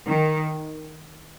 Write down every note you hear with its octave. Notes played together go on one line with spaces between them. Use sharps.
D#3